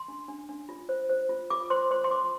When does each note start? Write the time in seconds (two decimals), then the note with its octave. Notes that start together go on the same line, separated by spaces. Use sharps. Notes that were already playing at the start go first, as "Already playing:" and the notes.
Already playing: C6
0.08 D4
0.28 D4
0.49 D4
0.69 F4
0.89 C5
1.09 C5
1.29 F4
1.50 F4 D6
1.70 C5 C6
1.91 C5 C6
2.04 C6
2.11 F4 D6